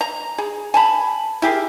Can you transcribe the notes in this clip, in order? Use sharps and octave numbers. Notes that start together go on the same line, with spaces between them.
A#5
G#4
G#5 A5 B5
E4 G4 G#4 A#4